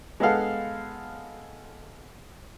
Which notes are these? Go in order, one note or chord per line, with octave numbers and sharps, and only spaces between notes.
G#3 B3 A4 F5 F#5